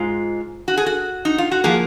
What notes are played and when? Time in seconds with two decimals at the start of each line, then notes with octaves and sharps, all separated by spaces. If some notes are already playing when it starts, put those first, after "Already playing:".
Already playing: G#2 G#3 F4
0.68 F#4
0.77 G#4
0.86 F#4
1.25 D#4
1.38 F4
1.51 F#4
1.64 F3 A#3 G#4